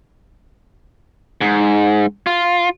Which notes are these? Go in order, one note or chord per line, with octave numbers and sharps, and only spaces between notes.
G#2
F4